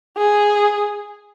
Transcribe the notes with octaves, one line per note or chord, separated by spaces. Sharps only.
G#4